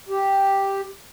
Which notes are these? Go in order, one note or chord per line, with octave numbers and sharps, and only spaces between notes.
G4